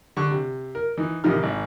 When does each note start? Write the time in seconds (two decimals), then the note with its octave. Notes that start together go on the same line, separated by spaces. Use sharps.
0.17 D3 G3 C#6 F#6
0.31 C3
0.75 A#4
0.97 E3 D#4
1.24 A1 C3 D#3 F6
1.43 G#1